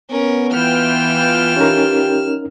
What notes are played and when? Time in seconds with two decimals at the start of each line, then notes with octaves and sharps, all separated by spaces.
0.11 B3 C#4 A#4
0.53 E3 F4 G5 F6 E7
1.57 C#4 D#4 G4 A#4